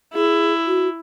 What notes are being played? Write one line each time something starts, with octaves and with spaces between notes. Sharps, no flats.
E4 G#4
F#4